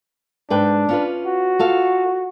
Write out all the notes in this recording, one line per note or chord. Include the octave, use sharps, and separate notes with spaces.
G#2 D4 B4 G5
C#4 F4 B4
F#4
F4 A4 F5